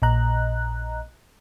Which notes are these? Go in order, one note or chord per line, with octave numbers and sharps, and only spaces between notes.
A#1 A#2 D#5 A#5 F#6